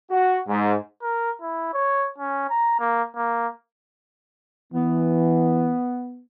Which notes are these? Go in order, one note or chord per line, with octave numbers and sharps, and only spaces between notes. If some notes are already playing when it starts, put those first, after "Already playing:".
F#4
G#2
A#4
E4
C#5
C#4
A#5
A#3
A#3
E3 B3